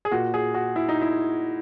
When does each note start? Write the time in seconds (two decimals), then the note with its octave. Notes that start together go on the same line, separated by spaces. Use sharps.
0.05 G#4
0.11 A#2 F#4
0.34 G#4
0.54 F#4
0.76 E4
0.89 D#4
1.01 E4